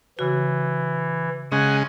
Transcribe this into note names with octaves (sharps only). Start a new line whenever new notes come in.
C#3 E3 F#4
C#3 G#3 F#5 G#5